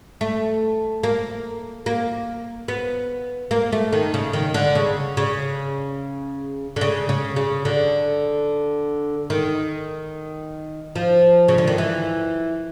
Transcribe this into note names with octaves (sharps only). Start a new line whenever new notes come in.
A3
A#3
A#3
B3
A#3
A3
D#3
C#3
D#3
D3
C#3
C#3
D3
C#3
C#3
C#3
D3
D#3
F3
C#3
D3
D#3
E3